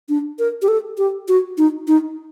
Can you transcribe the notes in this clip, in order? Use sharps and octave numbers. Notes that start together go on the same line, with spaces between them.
D4
A#4
G4
A4
G4
F#4
D#4
D#4